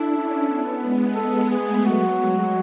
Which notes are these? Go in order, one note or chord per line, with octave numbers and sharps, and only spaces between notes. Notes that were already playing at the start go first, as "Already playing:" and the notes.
Already playing: D4 E4 A4
C#4
B3
G#3
G#3 A4
A3 G#4
F#3 F#4
G#3